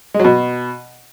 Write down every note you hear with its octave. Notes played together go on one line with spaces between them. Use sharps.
G#3
F#3
B2